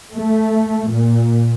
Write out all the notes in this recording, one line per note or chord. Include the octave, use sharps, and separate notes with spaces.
A3
A#2